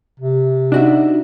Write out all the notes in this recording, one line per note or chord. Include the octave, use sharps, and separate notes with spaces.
C3
D4 D#4 F#4 E5